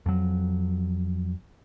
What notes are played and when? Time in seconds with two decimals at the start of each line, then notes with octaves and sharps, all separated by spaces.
0.06 F2 F#3